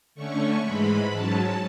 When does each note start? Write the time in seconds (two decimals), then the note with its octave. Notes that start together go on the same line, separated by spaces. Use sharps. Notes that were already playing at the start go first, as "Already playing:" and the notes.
0.15 D3 A3 C#4 C#6
0.61 G#2 E3 G#3 B5
1.08 G#2 F#3 C#4 A5